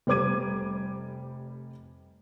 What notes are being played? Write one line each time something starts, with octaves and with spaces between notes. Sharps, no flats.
F1 G3 C5 D6 G#6 D#7